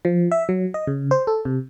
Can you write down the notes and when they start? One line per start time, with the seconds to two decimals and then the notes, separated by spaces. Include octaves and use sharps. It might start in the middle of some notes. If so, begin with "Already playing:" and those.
0.05 F3
0.32 E5
0.49 F#3
0.74 D#5
0.87 C#3
1.11 C5
1.27 A4
1.45 C3